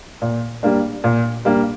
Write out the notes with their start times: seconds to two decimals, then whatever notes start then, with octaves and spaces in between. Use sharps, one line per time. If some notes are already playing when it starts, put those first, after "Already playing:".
0.22 A#2
0.63 G3 A#3 D4
1.04 A#2
1.45 G3 A#3 D4